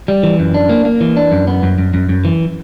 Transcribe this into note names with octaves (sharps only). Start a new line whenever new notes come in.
G3
E3
F#2
D4
A#3
A#3
E3
D4
F#2
B3
F#2
F#2
F#2
F#2
E3